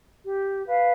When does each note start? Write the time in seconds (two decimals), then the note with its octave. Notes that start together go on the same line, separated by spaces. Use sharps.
0.24 G4
0.65 B4 F5